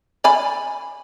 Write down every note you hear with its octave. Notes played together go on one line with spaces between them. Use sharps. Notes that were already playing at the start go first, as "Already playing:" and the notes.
D5 G#5 B5